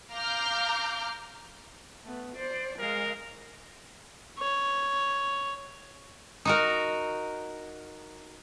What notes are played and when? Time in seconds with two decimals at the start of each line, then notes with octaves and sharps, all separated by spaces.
0.10 F5 A#5 D6 F6 G6
2.04 A3 B3
2.36 C5 D5
2.79 G#3 A#4 F5
4.39 C#5
6.45 D#4 F#4 A#4